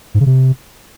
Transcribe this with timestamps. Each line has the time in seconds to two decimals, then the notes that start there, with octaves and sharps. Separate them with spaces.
0.14 G#2
0.20 C#3
0.26 C3